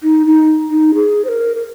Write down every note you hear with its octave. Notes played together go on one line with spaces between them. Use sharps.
D#4
D#4
D#4
G#4
C5
A#4
A#4